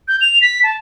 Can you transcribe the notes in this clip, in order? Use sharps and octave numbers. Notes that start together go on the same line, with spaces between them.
G6
F7
B6
A5